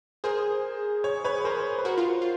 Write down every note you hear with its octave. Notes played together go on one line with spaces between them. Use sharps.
G#4 A#4 C5
C#5
B4 C#5
A#4 C5
B4
F#4 A#4 C5
F4
F4